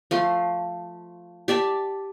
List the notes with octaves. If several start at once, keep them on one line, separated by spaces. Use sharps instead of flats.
F3 A3 C6
G4 D5 E5 A5